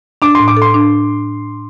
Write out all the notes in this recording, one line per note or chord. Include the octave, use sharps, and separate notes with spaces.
D4 D6
A2 C6
D6
A4
C6
D4